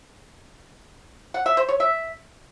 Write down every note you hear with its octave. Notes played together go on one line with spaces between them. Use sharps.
F#5
E5
C5
C#5
E5